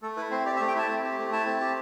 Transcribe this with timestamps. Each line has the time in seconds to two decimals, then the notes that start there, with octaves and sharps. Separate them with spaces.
0.02 A3 A4
0.17 E4 B4
0.31 C4 C5
0.45 G4 D5
0.56 E5
0.60 A3
0.68 G5
0.75 E4 A5
0.89 C4
1.03 G4
1.18 A3
1.32 E4 A5
1.46 C4
1.60 G4